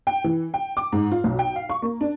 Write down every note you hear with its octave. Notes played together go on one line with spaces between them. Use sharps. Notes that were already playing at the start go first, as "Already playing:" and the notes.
G5
E3
G5
D6
G#2
F4
B1
G5
F5
C#6
A#3
D4